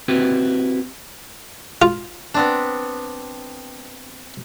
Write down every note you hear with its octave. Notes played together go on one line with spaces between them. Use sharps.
C4 E4 F#4 G4 B4
F4
B3 C4 D4